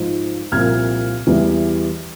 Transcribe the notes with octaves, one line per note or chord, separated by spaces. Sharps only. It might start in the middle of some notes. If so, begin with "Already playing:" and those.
Already playing: G#2 F3
C2 A#2 F3 F6 G#6
E2 E3 G3